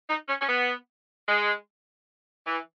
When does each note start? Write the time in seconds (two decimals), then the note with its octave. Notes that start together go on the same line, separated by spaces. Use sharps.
0.10 D#4
0.29 C#4
0.41 C#4
0.49 B3
1.29 G#3
2.47 E3